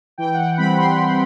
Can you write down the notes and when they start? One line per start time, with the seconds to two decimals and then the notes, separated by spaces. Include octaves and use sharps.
0.18 E3 G5
0.34 F#5
0.38 G5
0.57 G3 C4 B5
0.77 C6
0.98 E3